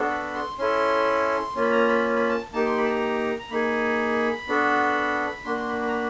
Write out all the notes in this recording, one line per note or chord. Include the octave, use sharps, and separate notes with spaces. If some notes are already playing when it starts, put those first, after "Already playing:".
Already playing: B3 D4 F#4 A4
B5
C6
C#4 E4 A4 C6
A#3 C#4 F4
B5
A#5
B5
B5
A5
A#3 D#4 G4 A5
C6
B5
A5
A#5
A#5
A#3 D#4 G#4 B5
B3 D4 F#4 A4
A#3 D4 F#4 C6
C6
B5
B5
A#5
B5